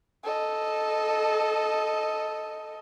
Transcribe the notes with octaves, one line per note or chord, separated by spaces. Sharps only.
A4 D#5